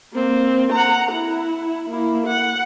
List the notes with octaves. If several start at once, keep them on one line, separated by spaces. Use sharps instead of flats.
A#3 C4
F#5 A#5
E4
A#3 E4
F#5